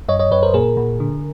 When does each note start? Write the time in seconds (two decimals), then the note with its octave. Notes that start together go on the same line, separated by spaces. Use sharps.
0.08 F#2 C#5 D#5
0.19 C#5 D#5
0.31 F#2 B4 C#5
0.43 A#4 C5
0.54 A#2 G#4 A#4
0.77 A#2
1.00 D3